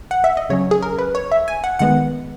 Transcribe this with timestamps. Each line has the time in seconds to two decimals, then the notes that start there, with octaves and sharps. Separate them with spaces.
0.11 F#5
0.24 E5
0.37 D#5
0.49 C#3 F#3 C#4 C#5
0.71 G#4
0.83 A#4
0.99 B4
1.15 C#5
1.32 E5
1.48 G#5
1.64 F#5
1.79 D#3 G#3 B3 F#5